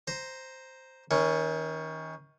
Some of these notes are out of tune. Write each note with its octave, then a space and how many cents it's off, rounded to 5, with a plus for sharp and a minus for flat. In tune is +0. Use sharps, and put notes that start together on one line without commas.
C5 +0 A#5 +0
D#3 +30 C#4 +0